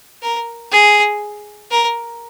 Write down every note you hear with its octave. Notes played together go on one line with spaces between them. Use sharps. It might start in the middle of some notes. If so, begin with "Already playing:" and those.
A#4
G#4
A#4